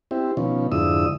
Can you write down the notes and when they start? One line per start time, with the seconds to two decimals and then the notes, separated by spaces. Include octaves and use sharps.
0.11 C4 E4 G4
0.37 B2 D#3 F3 C#4
0.72 F2 G#2 D3 E4 D#6 E6